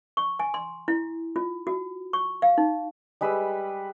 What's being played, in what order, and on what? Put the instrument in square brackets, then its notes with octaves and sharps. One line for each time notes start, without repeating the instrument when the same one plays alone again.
[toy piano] C#6
G#5
C6
E4
F4
F#4
C#6
F5
D#4
[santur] G3 G#3 B4 E6